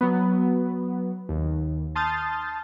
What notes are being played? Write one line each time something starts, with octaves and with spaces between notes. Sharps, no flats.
F#3 B3
D#2
A5 C6 D#6 F6 G6 A6